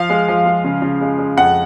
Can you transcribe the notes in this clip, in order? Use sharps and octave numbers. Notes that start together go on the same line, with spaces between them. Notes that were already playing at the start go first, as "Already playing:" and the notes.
Already playing: F3 F5
G#3
F3
G#3
C#3
C#3
G#3
G#3
F2 F#5